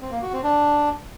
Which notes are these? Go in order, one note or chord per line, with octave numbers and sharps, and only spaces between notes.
C4
A#3
F#4
C4
D4